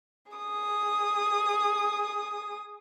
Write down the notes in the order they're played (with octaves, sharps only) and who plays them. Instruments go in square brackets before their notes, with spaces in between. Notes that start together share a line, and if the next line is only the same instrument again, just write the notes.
[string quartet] G#4 D#6